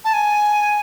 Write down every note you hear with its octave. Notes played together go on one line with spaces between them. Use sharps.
A5
G#5